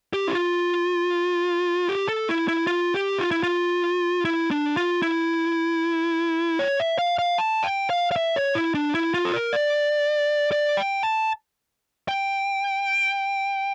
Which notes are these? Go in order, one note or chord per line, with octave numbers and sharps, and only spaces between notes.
G4
E4
F4
G4
A4
E4
E4
F4
G4
F4
E4
F4
E4
D4
F4
E4
C#5
E5
F5
F5
A5
G5
F5
F5
E5
C#5
E4
D4
E4
F4
A4
A#4
D5
D5
G5
A5
G5